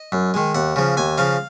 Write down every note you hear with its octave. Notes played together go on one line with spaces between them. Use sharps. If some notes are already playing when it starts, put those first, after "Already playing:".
Already playing: D#5
F#2
D#3 G#3
D#2 F#5
C#3 F3
D#2 G#5
C#3 F3 F5